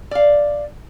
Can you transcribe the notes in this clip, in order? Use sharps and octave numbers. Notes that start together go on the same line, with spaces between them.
D5 F5